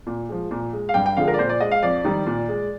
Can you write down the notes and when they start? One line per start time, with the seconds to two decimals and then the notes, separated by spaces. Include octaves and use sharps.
0.07 A#2
0.29 F3 G#3
0.51 A#2
0.73 G#3
0.89 F5
0.94 G2 G5
1.06 G5
1.17 D3 F3 G#3 F5
1.28 A#4
1.34 D5
1.39 A#2 C5
1.49 D5
1.60 G#3 D#5
1.71 F5
1.83 F2 D5
2.05 D#3 G3
2.26 A#2
2.49 G#3